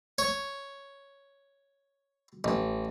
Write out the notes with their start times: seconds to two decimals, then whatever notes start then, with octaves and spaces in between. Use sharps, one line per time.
0.18 C#5
2.44 A1